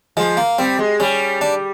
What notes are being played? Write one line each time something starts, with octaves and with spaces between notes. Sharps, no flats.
F3 G#3
A#3
G3 C4
G#3
G3 C#4
D4